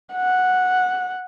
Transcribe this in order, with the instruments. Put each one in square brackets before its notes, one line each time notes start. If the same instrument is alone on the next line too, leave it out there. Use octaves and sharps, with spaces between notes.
[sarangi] F#5